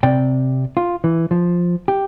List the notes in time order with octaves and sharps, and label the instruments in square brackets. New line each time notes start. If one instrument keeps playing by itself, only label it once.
[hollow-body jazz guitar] C3 D5 G5
F4
E3
F3
G4